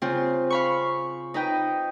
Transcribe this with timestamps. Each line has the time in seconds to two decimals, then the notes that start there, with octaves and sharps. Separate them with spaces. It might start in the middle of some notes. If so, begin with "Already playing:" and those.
0.02 C#3 C4 F4
0.50 F5 B5 C#6
1.34 D#4 B4 D#5 G5